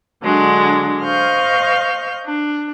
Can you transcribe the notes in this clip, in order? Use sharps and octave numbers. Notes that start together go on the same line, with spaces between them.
D3 F#3 G#3 D4
C5 D#5 F5 C#6 F6 G6
D4